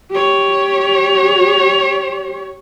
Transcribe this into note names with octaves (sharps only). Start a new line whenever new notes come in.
G4 C#5